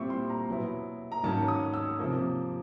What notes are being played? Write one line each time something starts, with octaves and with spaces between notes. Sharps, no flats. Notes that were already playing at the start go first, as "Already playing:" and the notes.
Already playing: A#2 G3 C4 E4 C#6
C6
A#5
B2 F#3 B3 E4
A#5
G#2 D#3 F#3 A#3 C#4 A5
D#6
E6
C3 F3 A#3